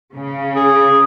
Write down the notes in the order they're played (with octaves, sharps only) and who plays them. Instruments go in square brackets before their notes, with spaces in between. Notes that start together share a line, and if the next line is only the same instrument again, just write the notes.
[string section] C#3
[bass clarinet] G#4